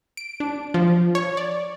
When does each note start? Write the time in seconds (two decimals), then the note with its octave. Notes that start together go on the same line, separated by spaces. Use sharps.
0.17 D7
0.40 D4
0.74 F3
1.15 C#5
1.37 D5